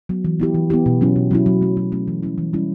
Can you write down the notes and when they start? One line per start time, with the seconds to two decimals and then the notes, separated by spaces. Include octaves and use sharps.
0.09 F#3 B3
0.24 E3
0.40 B3 E4 G4
0.54 E3
0.70 B3 E4 G4
0.86 B2
1.01 F#3 C#4 E4
1.16 B2
1.31 F#3 C#4 E4
1.46 F#3
1.61 A3 C#4
1.77 F#3
1.92 A3 C#4
2.08 E3
2.22 G3 C#4 E4
2.38 E3
2.53 G3 C#4 E4